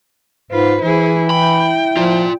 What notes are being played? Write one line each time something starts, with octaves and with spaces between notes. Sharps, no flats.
G#2 F4 B4 C5
E3 E4 G#4
E4 G5 B5
F3 F4 D5